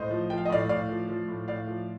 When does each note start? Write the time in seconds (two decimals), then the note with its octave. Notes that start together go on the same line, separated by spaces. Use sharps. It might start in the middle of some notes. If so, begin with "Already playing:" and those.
Already playing: A2 C5 D#5
0.11 F3
0.30 F3 G5
0.38 F5
0.45 D#5
0.50 A2 D5 F5
0.69 A2 D5 F5
0.89 F3
1.08 F3
1.28 A2
1.48 A2 D5 F5
1.67 F3